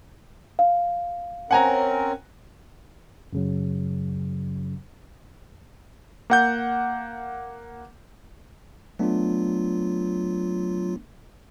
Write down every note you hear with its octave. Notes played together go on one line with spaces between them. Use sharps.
F5
C4 C#4 A#4 F#5 G#5 A#5
F#2 C#3 F#3
A#3 F#5 G6
F#3 A3 B3 D4 F4